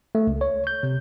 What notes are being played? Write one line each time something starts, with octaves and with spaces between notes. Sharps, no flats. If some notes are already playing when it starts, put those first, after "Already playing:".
A3
C#2
C#5
G6
C3